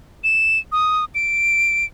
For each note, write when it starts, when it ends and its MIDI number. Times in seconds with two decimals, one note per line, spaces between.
0.24 0.59 100
0.72 1.05 87
1.15 1.85 98